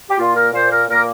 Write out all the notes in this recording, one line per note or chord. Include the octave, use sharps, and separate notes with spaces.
G4
A#2 A#3 F4
A#4
A#2 A#3 C5
A#4
A#2 A#3 A#4